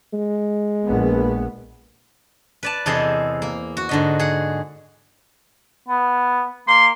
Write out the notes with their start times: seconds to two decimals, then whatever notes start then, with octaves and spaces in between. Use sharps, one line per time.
0.13 G#3
0.85 A#1 B3
2.63 B4 D5 A5
2.86 E2 C3 G#4 A4 C5 D#5
3.42 A#3
3.77 F#4
3.89 G#2 D3 D#5
4.19 G#4 F#5
5.88 B3
6.68 A#3 C6